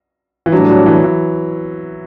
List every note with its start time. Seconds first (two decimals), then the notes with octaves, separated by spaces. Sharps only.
0.46 E3
0.52 A2 F#3 G3 D4
0.70 F#3
0.86 E3
1.04 E3